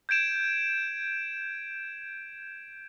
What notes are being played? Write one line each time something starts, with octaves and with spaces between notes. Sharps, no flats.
G6 G#6 D7 E7